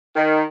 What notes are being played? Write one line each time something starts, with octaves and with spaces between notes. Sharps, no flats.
D#3